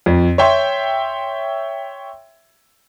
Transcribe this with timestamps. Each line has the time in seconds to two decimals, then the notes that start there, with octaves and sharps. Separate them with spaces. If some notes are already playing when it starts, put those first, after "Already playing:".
0.06 F2
0.38 C#5 E5 G5 C6